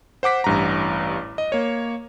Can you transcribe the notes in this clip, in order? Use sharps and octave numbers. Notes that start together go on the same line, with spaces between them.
C5 F#5 D6 B6
A1 G2 A#5
D#5
A#3 C#5